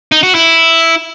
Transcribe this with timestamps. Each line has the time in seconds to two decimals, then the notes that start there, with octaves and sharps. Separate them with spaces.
0.12 D#4
0.23 F#4
0.35 E4